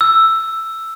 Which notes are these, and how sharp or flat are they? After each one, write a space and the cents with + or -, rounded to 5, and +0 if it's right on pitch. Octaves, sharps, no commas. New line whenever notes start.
E6 +5